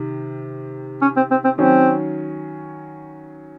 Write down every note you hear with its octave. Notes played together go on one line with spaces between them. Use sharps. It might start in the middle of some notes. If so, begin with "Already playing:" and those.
Already playing: C3 D#3
C#4
C4
C4
C4
D#3 F#3 C4 C#4